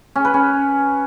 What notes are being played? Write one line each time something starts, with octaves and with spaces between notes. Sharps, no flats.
C#4
B4
C#4